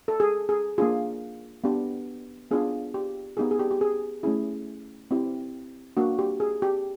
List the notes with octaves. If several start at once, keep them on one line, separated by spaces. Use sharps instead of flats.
A4
G#4
G#4
A#3 D4 F4 G#4
B3 D4 G4
B3 D4 F4 G#4
G4
B3 D#4 G4 G#4
G#4
G4
G4
G#4
A3 C#4 E4 G#4
C4 E4 G4
A#3 D4 F#4
G4
G#4
G4